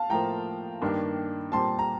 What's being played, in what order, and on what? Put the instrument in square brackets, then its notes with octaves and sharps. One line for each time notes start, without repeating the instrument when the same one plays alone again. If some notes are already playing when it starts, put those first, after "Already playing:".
Already playing: [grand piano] F5 A5
[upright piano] A2 F3 A#3 [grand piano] G5 A#5
[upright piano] G2 D#3 A#3 D4
[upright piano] A#2 G3 C4 [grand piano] A5 C6
[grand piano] A#5